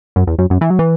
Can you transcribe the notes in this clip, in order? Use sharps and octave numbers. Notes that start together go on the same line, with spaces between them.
F#2
E2
F#2
F#2
E3
F#3
E3